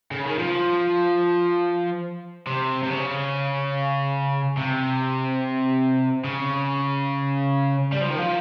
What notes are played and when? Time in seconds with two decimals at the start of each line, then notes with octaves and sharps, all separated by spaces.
0.11 C#3
0.25 D#3
0.38 F3
2.47 C3
2.83 C3
2.90 C#3
4.57 C3
6.24 C#3
7.92 G3
8.01 F3
8.10 D#3
8.18 F3